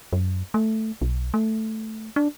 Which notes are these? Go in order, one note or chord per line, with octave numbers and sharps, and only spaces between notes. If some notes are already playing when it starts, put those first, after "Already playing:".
F#2
A3
B1
A3
D4